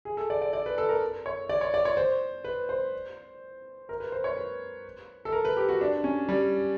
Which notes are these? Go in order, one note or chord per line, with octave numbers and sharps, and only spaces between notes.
G#4
A4
D5
D5
D5
B4
A4
A#4
C#5
D5
C#5
D5
C#5
C5
B4
C5
A#4
B4
C5
C#5
B4
A4
A#4
B4
G4
F#4
D4
C#4
G3